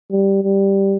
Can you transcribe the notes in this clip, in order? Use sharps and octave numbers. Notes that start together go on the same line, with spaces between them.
G3
G3